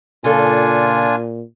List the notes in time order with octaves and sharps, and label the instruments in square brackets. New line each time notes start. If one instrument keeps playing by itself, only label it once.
[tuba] A#2 [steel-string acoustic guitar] C#3 A4 [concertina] D4 F4 G#5